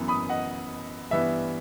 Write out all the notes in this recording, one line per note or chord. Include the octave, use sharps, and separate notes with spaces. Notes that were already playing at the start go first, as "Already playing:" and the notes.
Already playing: F#2 E3 B3
B5 D#6
D#5 F#5
G2 E3 B3 E5